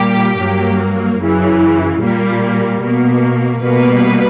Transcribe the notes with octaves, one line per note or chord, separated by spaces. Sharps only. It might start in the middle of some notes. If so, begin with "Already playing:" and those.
Already playing: A#2 G3 A#3 G4
G2 F#3 A#3
F#2 C#3 E3
A#2 G3 A#3
B2 A#3
B2 G3 A#3 B4